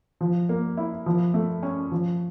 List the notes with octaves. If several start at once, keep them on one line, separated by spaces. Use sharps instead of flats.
F3
A#3
E4
F3
A3
C#4
F3